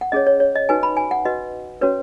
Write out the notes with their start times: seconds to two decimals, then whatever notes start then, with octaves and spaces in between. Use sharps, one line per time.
0.01 F#5
0.12 C#4 G#4 C#5 D#5
0.27 C#5
0.40 C#5
0.55 D#5
0.69 D#4 F#4 B4 G#5
0.83 B5
0.97 G#5
1.11 F#5
1.25 F#4 B4 D#5
1.81 C#4 F#4 B4 C#5